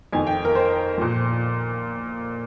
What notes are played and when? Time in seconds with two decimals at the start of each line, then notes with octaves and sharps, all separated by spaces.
0.13 F2 D#3 G#5
0.27 G5
0.45 A#4
0.55 C5
0.98 A#2 F3